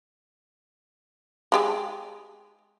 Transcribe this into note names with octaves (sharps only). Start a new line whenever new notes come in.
G#3 G4 G#4